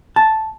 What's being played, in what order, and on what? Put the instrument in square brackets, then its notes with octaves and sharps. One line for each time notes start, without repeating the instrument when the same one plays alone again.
[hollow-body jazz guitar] A5